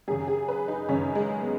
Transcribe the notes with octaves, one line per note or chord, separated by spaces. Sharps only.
F#2 C#3 G#4
G#4
B4
D#4
F#2 C#3 C#4
G#3
B3